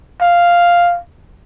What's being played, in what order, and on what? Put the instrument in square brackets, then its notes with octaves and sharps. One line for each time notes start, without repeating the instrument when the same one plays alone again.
[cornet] F5